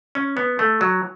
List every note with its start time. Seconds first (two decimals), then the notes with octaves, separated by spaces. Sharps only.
0.15 C#4
0.37 B3
0.59 A3
0.81 F#3